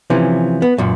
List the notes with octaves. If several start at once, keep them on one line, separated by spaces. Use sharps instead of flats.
C3 E3 F3 C#4
B3
F#2 A#2